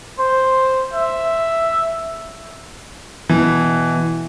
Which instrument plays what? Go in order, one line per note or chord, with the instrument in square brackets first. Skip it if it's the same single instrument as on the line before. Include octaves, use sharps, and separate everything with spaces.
[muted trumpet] C5
E5
[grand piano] B2 E3